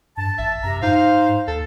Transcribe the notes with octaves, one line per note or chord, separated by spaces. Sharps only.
G2 A5
A1 E5
F#2 C3 A#5
G#2 D#4 C5 F5
D#2 A4